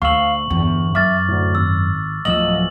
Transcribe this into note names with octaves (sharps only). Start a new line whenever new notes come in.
D2 F5 C#6 E6 F#7
G1 E2
F#2 E5 D6 F6 A6
D2 A2
G#1 E6
D1 F3 D#5 E6 F#7